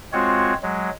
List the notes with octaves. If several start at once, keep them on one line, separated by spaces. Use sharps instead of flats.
G#3 C4 F4 F#4 C#5
F#3 G#3